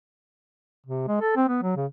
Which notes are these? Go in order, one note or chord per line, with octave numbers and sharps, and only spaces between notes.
C3
G#3
A4
C4
B3
F#3
C#3